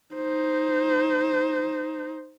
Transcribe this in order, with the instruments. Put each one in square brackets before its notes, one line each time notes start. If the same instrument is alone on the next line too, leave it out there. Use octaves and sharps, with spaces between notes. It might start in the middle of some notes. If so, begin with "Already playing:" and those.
[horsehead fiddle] D#4 C5